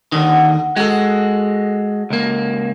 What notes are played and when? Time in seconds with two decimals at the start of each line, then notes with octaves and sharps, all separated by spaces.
0.12 D#2 D3 D#3
0.76 G#3 F#4 A4
2.10 C#2 A#3